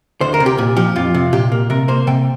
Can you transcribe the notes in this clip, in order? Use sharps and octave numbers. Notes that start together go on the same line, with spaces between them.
D2 C5
A#4
C3
G4
A#2
F3 G4
F2 F4
C3
A#2 G4
A#3
C3 A#4
A#3 C5
C3 G5